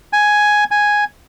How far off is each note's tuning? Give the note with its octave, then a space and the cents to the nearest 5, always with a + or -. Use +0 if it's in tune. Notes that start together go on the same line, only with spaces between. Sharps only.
G#5 +5
G#5 +0